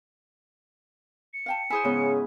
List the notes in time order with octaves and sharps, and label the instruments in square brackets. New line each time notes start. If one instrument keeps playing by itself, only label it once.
[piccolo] C#7
[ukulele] F5 G5 A5
[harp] E4 G#4 C5 [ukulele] G#5
[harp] G#2 B3 [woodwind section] C#3